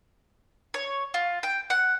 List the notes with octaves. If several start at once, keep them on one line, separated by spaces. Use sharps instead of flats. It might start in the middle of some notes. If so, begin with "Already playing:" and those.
C#5
F4
G5
F#5